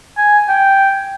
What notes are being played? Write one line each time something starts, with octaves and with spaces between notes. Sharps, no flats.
G#5
G5